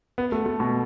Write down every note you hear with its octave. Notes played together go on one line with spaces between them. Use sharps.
B3
A3
A3
B2